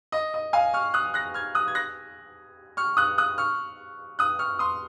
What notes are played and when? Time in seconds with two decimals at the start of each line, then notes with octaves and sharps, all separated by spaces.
0.12 D#5
0.34 D#5
0.53 F5 G#5
0.74 C#6 F6
0.94 D#6 F#6
1.14 F#6 A#6
1.34 F6 G#6
1.55 D#6 F#6
1.68 G#6
1.75 F#6 A#6
2.77 C#6 F6
2.97 D#6 F#6
3.18 D#6 F#6
3.38 C#6 F6
4.19 D#6 F#6
4.39 C#6 F6
4.59 C6 D#6